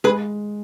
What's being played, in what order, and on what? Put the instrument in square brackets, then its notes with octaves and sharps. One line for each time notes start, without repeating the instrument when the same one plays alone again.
[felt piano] G#3 [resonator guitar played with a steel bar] G#4 B4